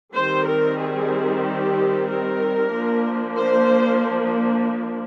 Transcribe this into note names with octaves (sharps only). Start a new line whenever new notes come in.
D#3 G3 C4 C5
A#4
G#4
G4
A#4
F3 A#3 D4
C5